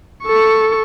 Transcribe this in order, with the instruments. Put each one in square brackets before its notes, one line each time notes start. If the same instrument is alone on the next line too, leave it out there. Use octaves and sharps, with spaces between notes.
[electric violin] A4 C#6